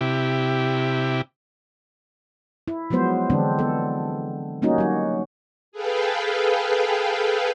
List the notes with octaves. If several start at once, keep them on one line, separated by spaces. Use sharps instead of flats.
C3 E4 G4
E4
F3 F#3 G#3 B3 C5
D3 E3 G#3 C4 D4
B3 A4
G3 A#3 C#4 D#4 F#4
F#3 F#4
G#4 A4 B4 F5 G5